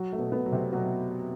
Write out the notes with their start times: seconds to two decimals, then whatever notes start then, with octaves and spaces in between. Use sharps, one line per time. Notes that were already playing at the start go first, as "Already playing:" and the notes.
Already playing: F#3 F#4
0.12 A3
0.19 B2
0.32 B3
0.46 F#3
0.52 C3 C4
0.72 B2 F#3 F#4